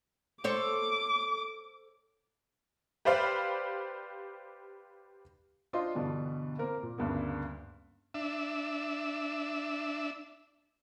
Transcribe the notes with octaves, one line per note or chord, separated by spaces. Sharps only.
A4 C5 C#5 D6
G4 B4 C5 D5 F5
D4 F4 C5 D#5 C6
G2 B2 D3 E3 G3
A#3 C4 A#4
A#2
D2 G2 C#3 A#3 B3
D4 E5